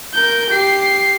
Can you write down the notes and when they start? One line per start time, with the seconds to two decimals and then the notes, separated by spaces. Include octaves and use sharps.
0.14 A#4 G6
0.51 G4 C7